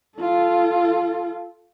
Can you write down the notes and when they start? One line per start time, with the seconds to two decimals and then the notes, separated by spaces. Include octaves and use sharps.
0.18 F4 A4